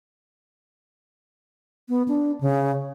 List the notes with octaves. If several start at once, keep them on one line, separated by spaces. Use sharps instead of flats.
B3
D4
C#3